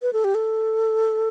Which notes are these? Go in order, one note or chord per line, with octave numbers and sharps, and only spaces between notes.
B4
A4
G4
A4